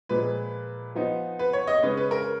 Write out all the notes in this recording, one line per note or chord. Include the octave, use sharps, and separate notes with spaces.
A#2 F3 G#3 B4
F3 B3 D#4
B4
C#5
D#5
C#3 G#3 C#4 B4
B4
A#4